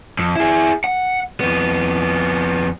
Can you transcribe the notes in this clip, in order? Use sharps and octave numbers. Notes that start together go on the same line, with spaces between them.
F2
E4 G#4
F#5
F2 B3